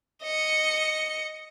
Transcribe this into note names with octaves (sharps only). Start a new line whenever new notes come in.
D#5 C#7